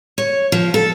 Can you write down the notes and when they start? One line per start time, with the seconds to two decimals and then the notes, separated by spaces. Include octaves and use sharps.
0.18 C#5
0.52 F3
0.74 A4